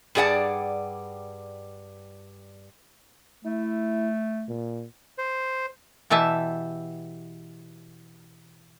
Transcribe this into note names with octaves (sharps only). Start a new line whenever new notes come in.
G2 G3 G#4 D5 F#5 A5
A3 E4
A#2
C5
B2 E3 G4 E5 A5